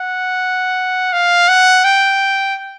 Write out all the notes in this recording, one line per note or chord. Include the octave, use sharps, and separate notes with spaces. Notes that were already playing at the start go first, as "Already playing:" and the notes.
Already playing: F#5
F5
F#5
G5